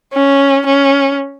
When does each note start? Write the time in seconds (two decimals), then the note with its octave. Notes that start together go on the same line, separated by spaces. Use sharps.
0.13 C#4
0.66 C#4